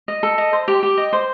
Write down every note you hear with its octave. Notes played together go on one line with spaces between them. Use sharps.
D#5
A4
D#5
C5
G4
G4
D#5
C5